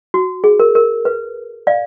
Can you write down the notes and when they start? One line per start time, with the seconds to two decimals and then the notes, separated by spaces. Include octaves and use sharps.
0.14 F#4
0.44 G#4
0.60 A#4
0.75 A#4
1.05 B4
1.67 D5 F5